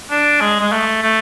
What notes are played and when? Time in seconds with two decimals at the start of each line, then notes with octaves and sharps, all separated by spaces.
0.11 D4
0.41 G#3
0.60 G#3
0.72 A3
1.02 A3